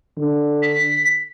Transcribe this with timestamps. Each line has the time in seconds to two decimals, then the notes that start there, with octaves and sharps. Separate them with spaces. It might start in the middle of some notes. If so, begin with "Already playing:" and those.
0.17 D3
0.63 B6